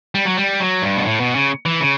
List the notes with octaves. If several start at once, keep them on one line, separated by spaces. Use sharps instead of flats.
G3
F#3
G3
F#3
G2
B2
A2
B2
C#3
E3
C#3